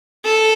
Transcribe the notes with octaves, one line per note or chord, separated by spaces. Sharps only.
A4